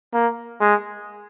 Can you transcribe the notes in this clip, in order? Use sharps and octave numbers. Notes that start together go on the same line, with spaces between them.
A#3
G#3